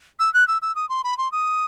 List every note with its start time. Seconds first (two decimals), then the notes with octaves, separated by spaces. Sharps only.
0.19 E6
0.34 F#6
0.48 E6
0.62 E6
0.75 D#6
0.89 C6
1.04 B5
1.18 C6
1.32 D#6